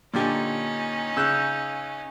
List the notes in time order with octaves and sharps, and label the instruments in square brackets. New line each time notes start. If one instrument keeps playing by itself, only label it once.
[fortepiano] A#2 D3 G4 [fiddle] C#4 D#4
[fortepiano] C#3 F#6 [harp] E6 G6